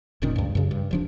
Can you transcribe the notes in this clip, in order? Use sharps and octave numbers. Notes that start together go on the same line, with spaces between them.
F1 A#2 D#3 C#4
C#2 G2
F#2 C#3
G2
D1 F3 D4